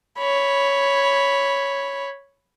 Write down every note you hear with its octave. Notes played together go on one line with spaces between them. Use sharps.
C#5 B5